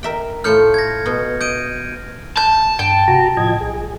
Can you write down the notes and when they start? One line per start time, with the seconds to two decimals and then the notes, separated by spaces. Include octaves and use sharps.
0.03 A#4 E5 G5
0.44 A2 A3 F4 F6 G6 C#7
0.74 G#6 A#6
1.06 B2
1.41 D#5 G6 D7 D#7
2.37 A5 G6
2.79 G2 G5
3.08 C3 F#4 A#5
3.37 A2 F3 D#5 G#6
3.61 B1 G#4